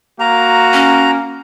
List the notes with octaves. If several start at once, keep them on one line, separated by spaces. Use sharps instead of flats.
A#3 F#4 A#5
C#4